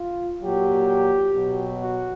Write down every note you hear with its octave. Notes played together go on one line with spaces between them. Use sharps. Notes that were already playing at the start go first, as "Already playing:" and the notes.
Already playing: F4
A#2 F#3 G4
B2 F#3
F#4